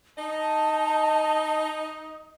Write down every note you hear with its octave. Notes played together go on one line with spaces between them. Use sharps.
D#4 D#5 A5